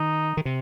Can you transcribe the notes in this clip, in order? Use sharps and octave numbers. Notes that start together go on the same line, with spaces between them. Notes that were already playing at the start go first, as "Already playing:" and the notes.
Already playing: D#3 D#4
D#3
C3